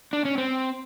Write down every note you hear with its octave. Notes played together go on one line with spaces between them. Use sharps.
D4
C#4
C4